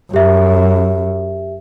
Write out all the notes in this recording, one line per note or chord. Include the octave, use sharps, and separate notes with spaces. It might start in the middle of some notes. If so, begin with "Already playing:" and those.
F#2 G4 E5